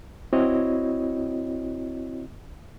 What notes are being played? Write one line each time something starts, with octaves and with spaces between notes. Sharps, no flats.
C4 E4 F#4 C#5 D#5